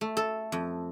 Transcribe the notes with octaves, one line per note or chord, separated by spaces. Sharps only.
A3
A4
F2